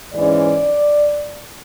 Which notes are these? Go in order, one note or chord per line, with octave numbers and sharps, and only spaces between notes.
G#2 E3 G#3 C#4 D5